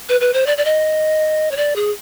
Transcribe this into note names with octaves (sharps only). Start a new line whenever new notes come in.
B4
B4
C5
D5
D5
D#5
C#5
D5
G#4